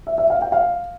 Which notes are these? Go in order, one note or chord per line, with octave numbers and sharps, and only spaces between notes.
E5
E5
F5
G5
F5